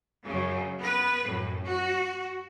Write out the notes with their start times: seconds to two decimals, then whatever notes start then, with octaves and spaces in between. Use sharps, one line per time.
0.24 F#2 C#3
0.78 B3 B4
1.26 F#2 A2
1.64 F#4